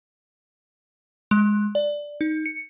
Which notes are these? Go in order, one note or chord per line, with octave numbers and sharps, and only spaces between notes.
G#3
D5
D#4
C#7